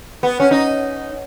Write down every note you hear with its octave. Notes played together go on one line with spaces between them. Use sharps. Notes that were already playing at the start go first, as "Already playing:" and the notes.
B3
C#4
D#4